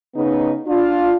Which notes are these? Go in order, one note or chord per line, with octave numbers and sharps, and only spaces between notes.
C#3 B3 D#4
D4 F4